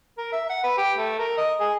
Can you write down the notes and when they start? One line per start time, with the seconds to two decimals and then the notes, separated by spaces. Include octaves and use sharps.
0.18 A#4
0.32 E5
0.49 F#5
0.64 B4
0.78 G4
0.98 A3
1.19 A#4
1.38 D#5
1.60 G#4